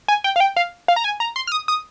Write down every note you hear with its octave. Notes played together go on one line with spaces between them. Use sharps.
G#5
G5
F5
G5
F5
F5
A#5
G#5
A#5
C6
F6
D#6
D#6